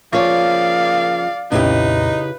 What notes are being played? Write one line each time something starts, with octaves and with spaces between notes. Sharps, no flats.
C#3 F3 A#3 C#5 D5 F5
C2 F2 A#2 C#3 D#4 E4 G4 B4